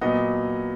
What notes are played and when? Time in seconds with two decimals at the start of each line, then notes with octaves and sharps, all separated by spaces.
0.01 A#2 F#3 B3 D#5